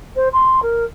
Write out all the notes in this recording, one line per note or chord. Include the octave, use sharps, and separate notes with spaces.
C5
C6
A#4